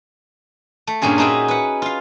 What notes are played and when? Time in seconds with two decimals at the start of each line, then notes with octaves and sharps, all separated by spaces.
0.87 A3
1.02 G2 A#2 C#4 F4 G#4
1.18 D#4 F#4 G#4 E5 G5
1.48 B4 F#5
1.82 F4 F5